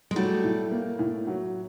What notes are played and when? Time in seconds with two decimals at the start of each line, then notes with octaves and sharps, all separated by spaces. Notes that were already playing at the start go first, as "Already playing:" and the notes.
0.11 G#3
0.16 F#3 G3 A3
0.44 A2
0.71 A#3
0.99 A2
1.27 F#3